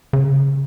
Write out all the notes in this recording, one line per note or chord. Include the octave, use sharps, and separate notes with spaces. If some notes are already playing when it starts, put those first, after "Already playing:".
C#3